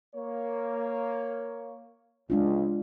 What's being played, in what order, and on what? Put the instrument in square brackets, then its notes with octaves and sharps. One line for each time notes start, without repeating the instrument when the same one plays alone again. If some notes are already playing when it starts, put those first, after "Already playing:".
[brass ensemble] A#3 C#5
[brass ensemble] C#2 [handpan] G#3 D4 F4